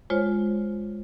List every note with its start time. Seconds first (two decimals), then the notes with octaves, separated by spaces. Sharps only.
0.10 G#3 F4 C5 C#5